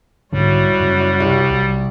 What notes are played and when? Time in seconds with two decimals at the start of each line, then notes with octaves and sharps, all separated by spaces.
0.33 B1 G#2 D3 G3 E4 F#4 C#5
0.80 F#2 C#3
1.21 C2
1.50 B1